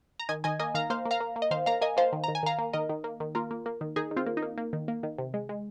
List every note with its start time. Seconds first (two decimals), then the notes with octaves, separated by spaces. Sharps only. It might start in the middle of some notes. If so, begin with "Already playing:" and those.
0.20 A#5
0.29 D#3 D#5 G#5
0.44 D#3 D#5 G#5
0.60 A#3 D#5 G#5
0.75 D#3 F5 A#5
0.90 A#3 C5 F5
1.05 A#3
1.11 F5 A#5
1.20 A#3
1.36 A#3
1.42 D#5
1.51 D#3 C5 F5
1.66 A#3 F5 A#5
1.81 A#3 D#5 G#5
1.97 A#3 C5 F5
2.13 D#3
2.24 D#3 A#5
2.35 G#5
2.43 D#3 F5 A#5
2.59 A#3
2.73 D#3 A#4 D#5
2.89 D#3
3.04 A#3
3.20 D#3
3.35 A#3 F4 A#4
3.51 A#3
3.66 A#3
3.81 D#3
3.96 D#3 D#4 G#4
4.11 D#3
4.16 C4 F4
4.26 A#3
4.37 D#4
4.42 A#3
4.58 A#3
4.73 D#3
4.88 A#3
5.03 D#3
5.18 C3
5.34 G#3
5.49 G#3